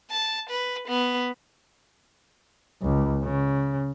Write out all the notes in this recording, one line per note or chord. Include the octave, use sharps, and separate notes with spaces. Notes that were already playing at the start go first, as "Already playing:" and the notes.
A5
B4
B3
C#2
C#3